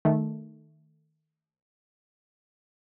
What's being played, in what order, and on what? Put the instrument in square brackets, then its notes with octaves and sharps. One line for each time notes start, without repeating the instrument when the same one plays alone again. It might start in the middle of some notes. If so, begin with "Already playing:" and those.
[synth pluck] D#3 A3